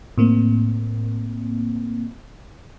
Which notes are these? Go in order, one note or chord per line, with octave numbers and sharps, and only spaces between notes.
A2 A#3 C4